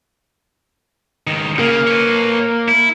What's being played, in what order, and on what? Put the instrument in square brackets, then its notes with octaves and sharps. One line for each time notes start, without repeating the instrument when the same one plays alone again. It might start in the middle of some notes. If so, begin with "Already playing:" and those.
[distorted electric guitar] C#2 D#3
[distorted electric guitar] C#3 [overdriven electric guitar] A#3
[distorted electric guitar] B4 C#5
E4